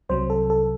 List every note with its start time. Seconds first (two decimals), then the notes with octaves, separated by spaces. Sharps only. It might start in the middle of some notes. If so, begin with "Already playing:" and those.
0.09 C2 C3 F#3 C5
0.30 A4
0.50 A4